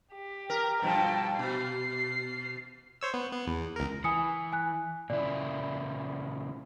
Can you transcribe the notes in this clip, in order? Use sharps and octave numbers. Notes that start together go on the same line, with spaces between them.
G4
A#4
G2 B2 F3 G5 A5
B2 C7
C5 C#5 E6
B3
B3
E2
C#2 A#4
E3 G#5 D#6 C#7
G#5 F#6
A#2 C#3 E4 D5